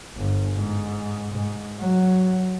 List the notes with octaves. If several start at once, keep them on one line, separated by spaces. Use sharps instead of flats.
G1
G#2
G#2
F#3